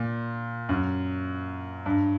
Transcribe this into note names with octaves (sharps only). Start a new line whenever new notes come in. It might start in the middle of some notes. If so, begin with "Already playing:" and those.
Already playing: A#2
F#2
G2